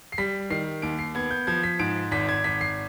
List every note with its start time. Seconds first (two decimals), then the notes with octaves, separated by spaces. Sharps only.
0.12 C7
0.18 G3 B6
0.50 D#3 C7
0.82 D#2 D7
0.99 C7
1.15 B3 G#6
1.31 G6
1.47 F3 G#6
1.63 B6
1.79 G#2 D7
2.11 G#1 B6
2.29 G#6
2.44 G#1 B6
2.61 C7